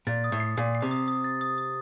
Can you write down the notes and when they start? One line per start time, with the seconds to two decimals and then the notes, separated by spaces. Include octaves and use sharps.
0.07 A#2 A6
0.24 D#6
0.32 A2
0.40 C7
0.57 A#2 C7
0.75 C7
0.82 C3
0.91 D#6
1.08 D#6
1.24 A6
1.41 D#6
1.58 D#6